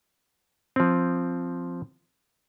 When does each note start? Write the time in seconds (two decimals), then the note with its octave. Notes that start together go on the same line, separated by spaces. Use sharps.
0.76 F3 C4